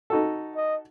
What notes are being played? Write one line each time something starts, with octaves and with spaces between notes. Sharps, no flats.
D#4 F#4 A4
D#5